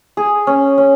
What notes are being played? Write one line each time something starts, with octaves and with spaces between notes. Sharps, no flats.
G#4
C#4
C#4